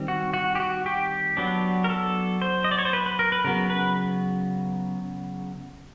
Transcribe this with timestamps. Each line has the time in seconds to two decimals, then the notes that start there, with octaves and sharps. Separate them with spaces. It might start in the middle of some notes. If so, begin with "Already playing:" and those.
Already playing: D#3 G3 C4
0.08 F#4
0.34 F#4
0.55 G4
0.60 F#4
0.86 G4
1.37 F#3 B3 D4
1.84 A#4
1.89 A4
2.42 C5
2.64 D#5
2.71 D5
2.78 C#5
2.85 C5
2.93 B4
3.06 B4
3.19 A#4
3.32 B4
3.45 C#3 F#3 B3 A#4
3.70 B4